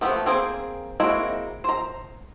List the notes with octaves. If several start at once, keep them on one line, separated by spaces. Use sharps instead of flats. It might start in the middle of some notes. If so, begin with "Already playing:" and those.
F3 A3 B3 G4
A#3 C4 G#4 C5
G#3 A#3 C4 E4 F#4
C5 A#5